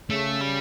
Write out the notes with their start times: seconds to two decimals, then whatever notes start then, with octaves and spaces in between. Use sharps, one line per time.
0.10 C#3 A3
0.41 G3